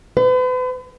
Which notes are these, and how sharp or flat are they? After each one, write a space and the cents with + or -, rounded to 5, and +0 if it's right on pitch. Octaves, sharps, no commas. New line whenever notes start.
B4 +40